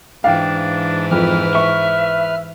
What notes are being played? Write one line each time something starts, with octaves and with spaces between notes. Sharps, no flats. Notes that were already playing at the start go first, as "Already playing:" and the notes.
G#2 E3 D4 F5 G5
F2 B4 F6
E5 C#6